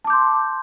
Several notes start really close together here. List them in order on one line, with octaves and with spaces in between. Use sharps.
A5 D6 G6 C6